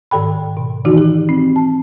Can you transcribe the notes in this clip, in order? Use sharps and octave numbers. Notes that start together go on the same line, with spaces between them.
G#2 D#3 A4 G5 B5
B2
D#3 E3 D#4 F#4
G4
C4
A5